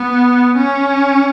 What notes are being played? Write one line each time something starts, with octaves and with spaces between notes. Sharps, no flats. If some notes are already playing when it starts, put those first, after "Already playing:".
Already playing: B3
C#4